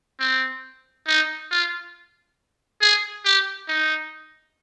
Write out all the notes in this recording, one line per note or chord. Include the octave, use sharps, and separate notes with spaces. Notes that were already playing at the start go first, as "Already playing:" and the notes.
C4
D#4
F4
G#4
G4
D#4